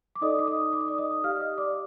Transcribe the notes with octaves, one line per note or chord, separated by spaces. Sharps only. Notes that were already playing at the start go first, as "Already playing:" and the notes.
D6
D#4 A4 D5 D#5 D#6
D6
D#5 D#6
D6
D#6
D5 D6
D#5 D#6
G4 D5 F5 F6
D#5 D#6
D5 D6